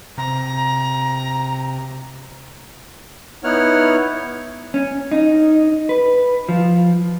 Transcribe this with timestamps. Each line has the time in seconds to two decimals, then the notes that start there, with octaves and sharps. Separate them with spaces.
0.18 C3 A#5
3.44 B3 D#4 E4 C#5 F#5 F6
4.74 C#4
5.11 D#4
5.89 B4
6.49 F3